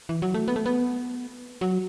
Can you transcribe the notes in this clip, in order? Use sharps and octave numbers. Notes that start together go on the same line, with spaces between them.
E3
F#3
A3
B3
A3
B3
F#3